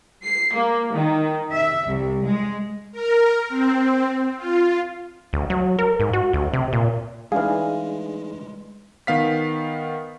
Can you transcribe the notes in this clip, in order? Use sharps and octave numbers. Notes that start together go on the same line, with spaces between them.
C7
A#3
D#3
E5
C2
G#3
A#4
C4
F4
D2
F#3
A#4
G#2
F#4
D2
C3
A#2
E3 G#3 A3 D4 D#4 G#4 F5
D#3 B3 F5 B6